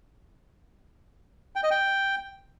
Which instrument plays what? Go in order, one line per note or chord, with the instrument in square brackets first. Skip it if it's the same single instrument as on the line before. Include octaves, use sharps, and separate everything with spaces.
[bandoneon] G5
D#5
G5